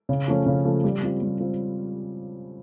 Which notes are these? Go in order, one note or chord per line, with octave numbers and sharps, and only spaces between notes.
C#3
F3 A3 C#4
C#3
F3 A3 C#4
G3
C4 F4
G3
C4 F4